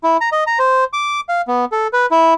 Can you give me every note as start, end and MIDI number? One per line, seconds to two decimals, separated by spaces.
0.04 0.17 64
0.21 0.29 82
0.32 0.44 75
0.47 0.59 82
0.59 0.84 72
0.93 1.20 86
1.29 1.41 77
1.48 1.65 59
1.72 1.87 69
1.93 2.06 71
2.11 2.34 64